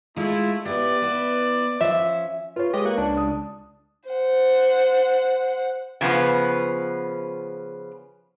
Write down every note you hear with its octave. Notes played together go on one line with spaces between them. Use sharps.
G#3 A3 E4 F4
B3 E4 G4 B4 D5
B3 E4
F3 C#4 E5
F4 B4 C#5
G#3 G4 D#5
A#3 C#6 F#6
C#2 D4
D#6
C5 F#5
C#3 F3 B3